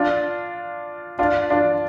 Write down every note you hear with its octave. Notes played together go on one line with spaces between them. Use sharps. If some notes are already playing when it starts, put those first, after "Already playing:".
Already playing: D4 F4
D4 F4
D4 F4